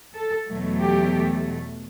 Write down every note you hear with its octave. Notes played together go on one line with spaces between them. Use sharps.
A4
E2 B2 F#3 A3
G4